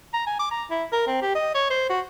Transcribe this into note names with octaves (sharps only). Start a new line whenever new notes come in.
A#5
G#5
D6
A#5
E4
A#4
C4
G4
D#5
C#5
C5
F#4